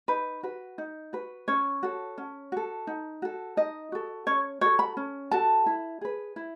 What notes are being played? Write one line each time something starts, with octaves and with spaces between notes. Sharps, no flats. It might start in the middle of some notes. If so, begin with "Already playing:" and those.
D#4 B4
F#4 B4
D#4
F#4 B4
C#4 C#5
F#4 A4
C#4
F#4 A4
D#4
F#4 A4
D#4 D#5
F#4 A4
C#4 C#5
F#4 A4 C#5
B5
C#4
F#4 A4 A5
E4
G#4 B4
E4